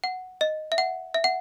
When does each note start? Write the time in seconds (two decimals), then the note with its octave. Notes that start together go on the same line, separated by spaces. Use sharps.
0.04 F#5
0.41 D#5
0.72 E5
0.78 F#5
1.14 E5
1.24 F#5